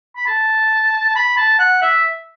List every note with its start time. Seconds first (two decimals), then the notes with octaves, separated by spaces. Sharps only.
0.16 B5
0.27 A5
1.16 B5
1.37 A5
1.59 F#5
1.82 E5